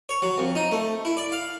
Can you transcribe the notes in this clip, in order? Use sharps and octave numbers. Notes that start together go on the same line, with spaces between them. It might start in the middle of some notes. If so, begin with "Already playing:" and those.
C#5
F#3
F2
D#4
A3
E4
D5
F5